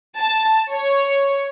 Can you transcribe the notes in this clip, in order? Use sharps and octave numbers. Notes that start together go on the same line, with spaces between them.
A5
C#5